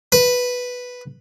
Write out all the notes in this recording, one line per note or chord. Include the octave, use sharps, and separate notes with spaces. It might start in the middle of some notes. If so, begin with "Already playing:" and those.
B4